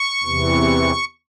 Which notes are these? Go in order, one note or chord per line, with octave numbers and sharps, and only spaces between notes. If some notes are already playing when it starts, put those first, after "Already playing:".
Already playing: C#6
E2 C3 E3